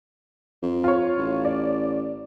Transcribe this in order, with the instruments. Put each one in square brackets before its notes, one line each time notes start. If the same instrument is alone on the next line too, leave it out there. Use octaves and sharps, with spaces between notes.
[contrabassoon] F2
[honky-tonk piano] F4 C#5
[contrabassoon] A1
[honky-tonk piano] D5